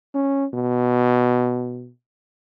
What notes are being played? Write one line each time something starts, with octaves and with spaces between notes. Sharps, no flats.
C#4
B2